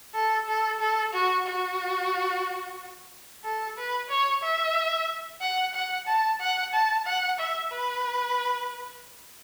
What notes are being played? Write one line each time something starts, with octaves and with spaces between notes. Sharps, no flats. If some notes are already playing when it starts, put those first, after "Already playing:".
A4
A4
A4
F#4
F#4
A4
B4
C#5
E5
F#5
F#5
A5
F#5
A5
F#5
E5
B4